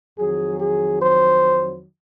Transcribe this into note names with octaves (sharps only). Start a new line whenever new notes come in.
F2 D#3 F#3 G#4
G#4
C5